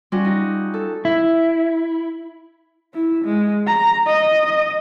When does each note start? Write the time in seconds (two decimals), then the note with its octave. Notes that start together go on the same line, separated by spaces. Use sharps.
0.12 G3 C#4 F4 F#4
0.25 D#4
0.74 A4
1.05 E4
2.94 E4
3.25 G#3
3.67 A#5
4.06 D#5